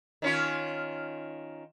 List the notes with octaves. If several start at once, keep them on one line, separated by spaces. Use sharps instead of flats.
D#3 C#4 F4